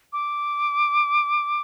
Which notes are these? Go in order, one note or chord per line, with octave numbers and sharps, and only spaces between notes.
D6